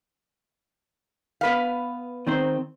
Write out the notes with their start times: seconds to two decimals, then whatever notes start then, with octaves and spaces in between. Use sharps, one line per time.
1.41 B3 B4 F5
2.27 D#3 C4 C5